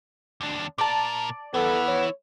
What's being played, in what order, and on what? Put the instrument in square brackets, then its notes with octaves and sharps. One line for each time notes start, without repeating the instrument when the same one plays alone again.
[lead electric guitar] D#2 D4
[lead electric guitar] A#2 A#4 [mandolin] D5 A5
[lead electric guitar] E3 E4 [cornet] B3 [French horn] A4
[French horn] C#5